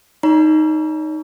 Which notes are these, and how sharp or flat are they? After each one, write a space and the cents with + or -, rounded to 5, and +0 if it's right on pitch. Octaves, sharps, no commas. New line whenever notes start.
D#4 +0 C#5 +40 A#5 +35